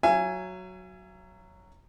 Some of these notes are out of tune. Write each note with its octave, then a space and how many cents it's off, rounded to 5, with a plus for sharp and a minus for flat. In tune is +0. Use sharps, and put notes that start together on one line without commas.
F#3 +0 E5 +45 G#5 +0